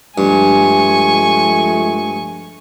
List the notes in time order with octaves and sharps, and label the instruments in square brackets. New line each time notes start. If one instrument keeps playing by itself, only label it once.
[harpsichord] G2 [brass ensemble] F3 G#3 A3 [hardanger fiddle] G#5 C#6